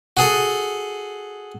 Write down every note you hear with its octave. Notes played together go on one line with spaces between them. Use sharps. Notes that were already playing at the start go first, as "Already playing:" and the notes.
F#4 G#4 A4